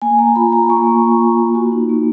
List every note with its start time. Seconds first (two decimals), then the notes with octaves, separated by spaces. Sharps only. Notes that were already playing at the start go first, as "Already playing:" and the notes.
0.02 A#3 G#5
0.18 A#3 A#5
0.36 F4 B5
0.53 F4 A#5
0.70 A#3 C#6
0.87 A#3
1.04 F4
1.21 F4
1.38 A#3
1.55 F#4
1.72 D#4
1.89 A#3